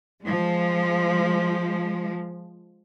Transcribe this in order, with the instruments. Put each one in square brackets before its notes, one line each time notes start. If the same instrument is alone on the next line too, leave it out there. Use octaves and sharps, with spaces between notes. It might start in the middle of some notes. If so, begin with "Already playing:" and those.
[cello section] F3 G#3